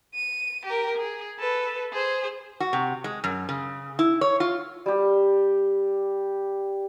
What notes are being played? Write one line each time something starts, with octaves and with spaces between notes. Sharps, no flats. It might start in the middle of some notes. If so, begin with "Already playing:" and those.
D#7
G4 A#4
G#4
A4 B4
G#4 C5
F#4
C3
G#3
F#2
C#3
E4
C#5
F4
G3 G4